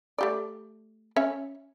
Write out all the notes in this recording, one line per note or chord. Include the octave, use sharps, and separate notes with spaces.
A3 G4 D5
C#4 C#5 E5